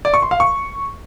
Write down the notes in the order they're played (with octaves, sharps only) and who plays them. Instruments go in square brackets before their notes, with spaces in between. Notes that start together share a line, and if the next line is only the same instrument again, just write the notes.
[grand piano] D5
C#6
C6
F5
C#6